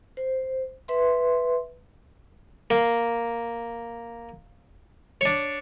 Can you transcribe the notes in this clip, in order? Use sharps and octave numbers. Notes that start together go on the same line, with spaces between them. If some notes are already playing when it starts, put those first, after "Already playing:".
C5
B4 E5 C6
A#3
D4 C#5